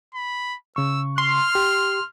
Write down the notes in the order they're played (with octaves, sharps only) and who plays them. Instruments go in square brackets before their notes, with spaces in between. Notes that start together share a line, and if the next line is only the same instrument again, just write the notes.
[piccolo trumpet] B5
[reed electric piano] C#3 C#6 [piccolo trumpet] E6
[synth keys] C6 [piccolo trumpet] F6
[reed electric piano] G4